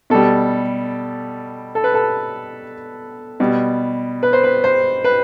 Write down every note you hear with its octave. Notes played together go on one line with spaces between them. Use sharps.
B2 G3 A4
A4
B4
A4
B2 G3
B4
C5
B4
C5
B4